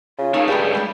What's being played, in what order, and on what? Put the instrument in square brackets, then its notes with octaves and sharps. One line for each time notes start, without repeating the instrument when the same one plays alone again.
[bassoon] C#3 [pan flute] F4
[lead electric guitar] C#2 A3 [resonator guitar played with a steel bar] D#4 A4 A#4 [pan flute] F5
[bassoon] G2 [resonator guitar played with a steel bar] G#3 B3 G4 [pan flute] G#4
[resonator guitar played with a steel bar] B2 G3 D5 [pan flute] G#3